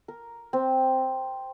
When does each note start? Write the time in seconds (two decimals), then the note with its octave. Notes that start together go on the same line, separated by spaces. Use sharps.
0.08 A#4
0.53 C4